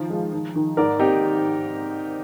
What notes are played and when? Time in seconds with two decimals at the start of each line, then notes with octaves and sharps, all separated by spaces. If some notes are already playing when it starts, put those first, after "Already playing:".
Already playing: D#3 F3
0.10 G#3
0.32 D#3
0.56 D#3
0.77 G#2 A#4 D5
0.99 C4 D#4 G4